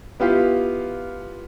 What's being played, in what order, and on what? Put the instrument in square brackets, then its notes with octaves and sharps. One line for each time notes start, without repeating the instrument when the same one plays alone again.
[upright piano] B3 E4 F4 G4